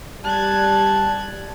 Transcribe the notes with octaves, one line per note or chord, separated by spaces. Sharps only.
G3 A5 F#6 G#6